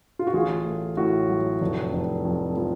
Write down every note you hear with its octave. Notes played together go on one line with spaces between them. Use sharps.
F4
F#4
A1 F4 G#4
A3
A2 F#4
F#3
F1
F1
F2
F3